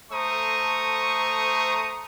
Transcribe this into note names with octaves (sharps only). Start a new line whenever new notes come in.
A3 A4 C5 A#5 C#6 D#6